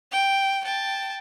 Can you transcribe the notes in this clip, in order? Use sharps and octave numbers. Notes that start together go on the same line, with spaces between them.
G5
G5 A5